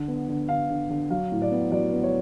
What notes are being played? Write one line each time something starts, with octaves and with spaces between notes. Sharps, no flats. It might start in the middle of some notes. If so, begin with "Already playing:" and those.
Already playing: D3
B3
D3
D3 F5
D3
D3
F#3 F5
A2
D5
B3
F#3 D5
B3
C#5